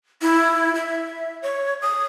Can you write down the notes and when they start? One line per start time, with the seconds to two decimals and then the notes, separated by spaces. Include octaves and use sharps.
0.22 E4
0.75 E5
1.42 C#5
1.82 D#6